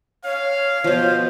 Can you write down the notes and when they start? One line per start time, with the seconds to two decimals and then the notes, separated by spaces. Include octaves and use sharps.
0.25 C#5 F5
0.84 B2 F3 C5